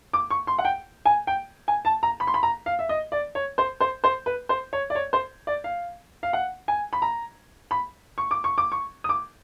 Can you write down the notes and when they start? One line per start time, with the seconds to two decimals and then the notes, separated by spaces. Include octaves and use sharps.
0.13 D6
0.31 C#6
0.47 C6
0.58 F#5
0.65 G5
1.05 G#5
1.27 G5
1.68 G#5
1.85 A5
2.03 A#5
2.20 B5
2.27 C6
2.34 B5
2.43 A#5
2.66 F5
2.79 E5
2.89 D#5
3.12 D5
3.35 C#5
3.58 C5
3.81 C5
4.04 C5
4.26 B4
4.49 C5
4.73 C#5
4.90 D5
4.95 C#5
5.13 C5
5.47 D5
5.64 F5
6.23 F5
6.33 F#5
6.68 G#5
6.93 B5
7.02 A#5
7.71 B5
8.18 C#6
8.31 D6
8.44 C#6
8.58 D6
8.72 C#6
9.04 D#6
9.09 D6